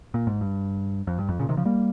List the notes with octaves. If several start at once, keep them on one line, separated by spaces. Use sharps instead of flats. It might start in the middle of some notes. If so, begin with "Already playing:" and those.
A#2
G#2
G2
F2
G2
F2
A#2 C#3
C3 D#3
C#3 F3
G3 A#3